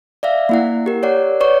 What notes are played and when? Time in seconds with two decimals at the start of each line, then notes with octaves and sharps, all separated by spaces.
0.23 D5 E5 F5
0.49 A#3 E4 F#5
0.86 G4 A#4
1.03 C#5 D5 F#5
1.41 B4 C#5 D5 C#6